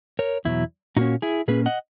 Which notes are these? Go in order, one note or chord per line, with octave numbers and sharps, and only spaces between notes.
A#4 C#5
E2 B2 F#3 E4
A#2 A#3 C#4 D#4 F#4
E4 G#4
A#2 A#3 C#4 G#4 B4
D#5 F#5